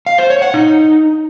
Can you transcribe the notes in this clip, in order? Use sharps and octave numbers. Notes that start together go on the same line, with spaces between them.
F5
C5
C#5
F#5
D#4